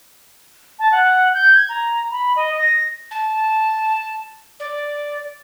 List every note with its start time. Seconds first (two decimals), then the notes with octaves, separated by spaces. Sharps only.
0.79 A5
0.92 F#5
1.34 G6
1.55 G#6
1.69 A#5
2.11 B5
2.36 D#5
2.58 A#6
3.11 A5
4.60 D5